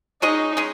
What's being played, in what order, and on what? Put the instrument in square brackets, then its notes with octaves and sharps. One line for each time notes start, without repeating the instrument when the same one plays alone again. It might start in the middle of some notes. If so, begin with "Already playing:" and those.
[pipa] G#3 C#4 G#4 D#5 [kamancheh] D#4
[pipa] G#3 C#4 G#4